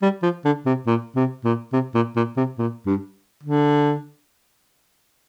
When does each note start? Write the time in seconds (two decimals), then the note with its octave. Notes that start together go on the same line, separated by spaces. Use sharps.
0.02 G3
0.22 F3
0.45 D3
0.66 C3
0.86 A#2
1.16 C3
1.44 A#2
1.72 C3
1.94 A#2
2.16 A#2
2.37 C3
2.58 A#2
2.86 G2
3.43 D3